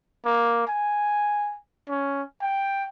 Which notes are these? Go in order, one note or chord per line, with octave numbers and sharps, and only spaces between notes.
A#3
G#5
C#4
G5